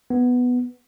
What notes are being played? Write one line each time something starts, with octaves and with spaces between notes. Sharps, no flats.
B3